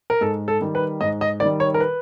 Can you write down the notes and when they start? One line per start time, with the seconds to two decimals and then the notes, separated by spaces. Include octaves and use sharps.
0.10 A#4
0.21 G#2 A4
0.48 A4
0.61 D#3 G3
0.75 B4
1.01 G#2 D#5
1.21 D#5
1.40 D#3 G3 D5
1.60 C#5
1.74 A#4
1.81 B4